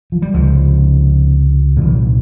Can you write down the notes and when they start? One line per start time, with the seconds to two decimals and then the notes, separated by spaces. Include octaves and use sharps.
0.12 F3
0.22 G3
0.34 C#2 C3 F3 G#3
1.76 A#2 E3 G3
1.81 C2
1.87 G3
1.95 F3